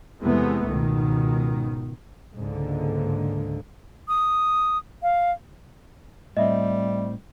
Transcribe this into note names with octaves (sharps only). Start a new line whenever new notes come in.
E2 C3 E3 G#3 A3 B3
C#2 G#2 B2 D#3
C#2 G#2 D3 A#3
D#6
F5
A2 G3 C4 D#5 E5